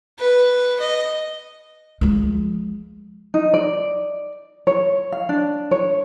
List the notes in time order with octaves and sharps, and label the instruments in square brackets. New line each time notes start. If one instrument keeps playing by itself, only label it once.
[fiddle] B4
D#5
[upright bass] F3 G#3
[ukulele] D#4
D5
C#5
F5
D4
C#5